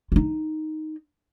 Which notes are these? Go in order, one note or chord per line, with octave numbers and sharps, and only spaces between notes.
D#4 F4